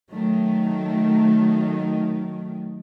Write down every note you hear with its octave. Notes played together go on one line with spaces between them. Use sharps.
D#3 F#3 A3